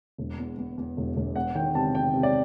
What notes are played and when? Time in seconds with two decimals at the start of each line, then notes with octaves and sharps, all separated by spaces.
0.18 E1
0.38 E2
0.58 E2
0.78 E2
0.97 E1
1.16 E1
1.35 E2 F#5
1.55 D#3 G5
1.75 C3 A5
1.94 C3 G5
2.13 C3
2.23 D5